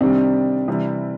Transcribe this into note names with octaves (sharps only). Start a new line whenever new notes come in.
C3 D#3 G3 C4 D4
C3 E3 G3